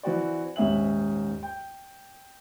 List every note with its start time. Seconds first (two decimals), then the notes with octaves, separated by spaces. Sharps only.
0.03 E3 C4 F#4 D5
0.56 D#1 G#2 C#4 E5 F#7
1.43 G5